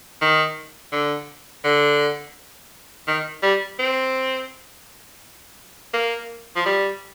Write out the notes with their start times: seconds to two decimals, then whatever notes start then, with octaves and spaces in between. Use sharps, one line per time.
0.22 D#3
0.93 D3
1.64 D3
3.08 D#3
3.43 G3
3.79 C4
5.94 A#3
6.56 F3
6.66 G3